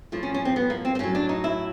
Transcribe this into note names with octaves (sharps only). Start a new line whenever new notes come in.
A2 F3
C#4
C#4
C4
B3
A#3
C4
C4
A2 F#3 C#4
D4
D#4
E4